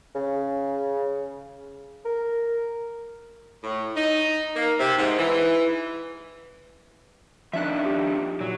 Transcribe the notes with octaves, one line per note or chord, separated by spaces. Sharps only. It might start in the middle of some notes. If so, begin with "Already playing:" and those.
C#3
A#4
A2
D#4
A#3
C3
G#2
E3
F3 D4 D#4 E5 F#6
G4
A#2 F#3